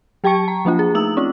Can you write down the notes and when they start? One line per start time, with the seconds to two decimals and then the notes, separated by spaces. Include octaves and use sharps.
0.24 F#3 G4 G5 A5 C#6 C#7
0.48 A#5
0.65 F3 A#3 D4 F4
0.79 G#4
0.95 A3 D#4 D#6 E6 F#7
1.17 C4 C#4 F4